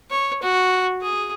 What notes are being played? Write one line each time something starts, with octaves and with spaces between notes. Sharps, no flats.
C#5
F#4
G#4